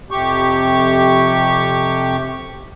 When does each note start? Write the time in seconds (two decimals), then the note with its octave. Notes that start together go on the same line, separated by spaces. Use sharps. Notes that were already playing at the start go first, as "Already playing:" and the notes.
0.11 F2 C3 G4 C#6